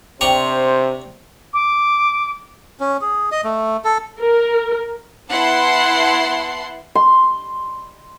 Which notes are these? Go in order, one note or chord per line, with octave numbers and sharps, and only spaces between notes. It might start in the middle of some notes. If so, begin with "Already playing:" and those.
C3 D4 G4 C5 A#5 C#6
D6
C#4
G#4
D#5
A3
A4
A#4
B3 E4 F#5 A5 C6 C7
C6